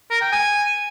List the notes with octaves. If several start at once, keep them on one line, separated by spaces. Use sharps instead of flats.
A#4
G5
G#5